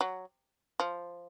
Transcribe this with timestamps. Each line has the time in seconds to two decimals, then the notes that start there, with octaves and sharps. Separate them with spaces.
0.01 F#3
0.80 F3